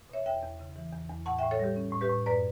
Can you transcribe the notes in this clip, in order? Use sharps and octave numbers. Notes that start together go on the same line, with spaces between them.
B2 C#5 E5
E2 E5 G5
E2
C#3
E3
E2
E2
A2 F#5 A5
E5 G5
A2
A4 C#5
G3 G4
C#4
A2
G4 B4
A2
F#2 B4 D5